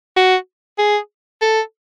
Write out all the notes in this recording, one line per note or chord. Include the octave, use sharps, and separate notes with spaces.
F#4
G#4
A4